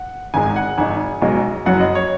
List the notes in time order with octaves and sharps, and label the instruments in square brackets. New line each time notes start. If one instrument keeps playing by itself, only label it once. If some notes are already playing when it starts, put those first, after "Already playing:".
Already playing: [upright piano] F#5
G#1 G#2 D#3 G#3 G#5
F#5
G#1 G#2 G#3 G#5
B1 B2 G#3
F#1 F#2 F#3 F#5
D#5
C#5